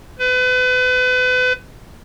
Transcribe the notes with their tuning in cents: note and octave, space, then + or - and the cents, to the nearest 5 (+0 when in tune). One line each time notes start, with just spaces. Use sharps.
B4 +35